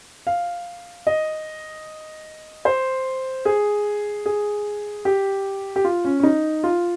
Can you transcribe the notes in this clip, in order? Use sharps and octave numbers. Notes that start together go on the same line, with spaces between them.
F5
D#5
C5
G#4
G#4
G4
G4
F4
C#4
C#4
D#4
F4